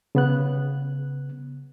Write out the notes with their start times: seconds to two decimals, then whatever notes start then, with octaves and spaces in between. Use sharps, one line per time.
0.15 C#3 B3 F#6